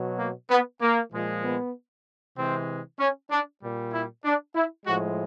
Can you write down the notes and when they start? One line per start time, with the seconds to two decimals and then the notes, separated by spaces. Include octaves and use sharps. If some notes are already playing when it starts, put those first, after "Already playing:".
Already playing: B2 F#3
0.19 A#3
0.50 B3
0.81 A#3
1.12 A#2 F3 G#3
1.43 B3
2.37 C3 E3 G#3 C4
2.99 C#4
3.31 D4
3.62 A#2 G3
3.93 E4
4.24 D4
4.55 E4
4.86 A2 F3 G#3 F#4